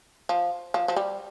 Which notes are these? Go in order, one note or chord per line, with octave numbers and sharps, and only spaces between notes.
F3
F3
F3
G3